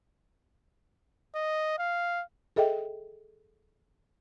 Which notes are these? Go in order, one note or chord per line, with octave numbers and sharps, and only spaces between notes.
D#5
F5
G#4 A4 D#5 E5 G5